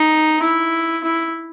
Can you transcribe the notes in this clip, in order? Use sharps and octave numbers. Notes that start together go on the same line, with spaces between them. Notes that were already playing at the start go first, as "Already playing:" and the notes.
Already playing: D#4
E4
E4